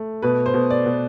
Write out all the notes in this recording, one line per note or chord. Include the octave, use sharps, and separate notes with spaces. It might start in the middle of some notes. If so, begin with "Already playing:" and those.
Already playing: A3
B2 B4
C5
B2
D5
B2